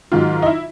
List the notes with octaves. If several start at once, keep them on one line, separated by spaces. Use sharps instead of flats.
G#2 D#3 F#3 F4
D#4
E4